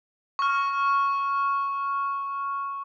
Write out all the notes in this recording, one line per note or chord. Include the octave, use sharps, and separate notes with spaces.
C#6 F6